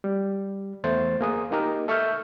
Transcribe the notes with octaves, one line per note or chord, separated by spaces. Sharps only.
G3
E2 A3 C5 A6
A#3 G#4 D#6
A#3 D#4 G4 A#4
A4 E5 C#6 E6 F6 G6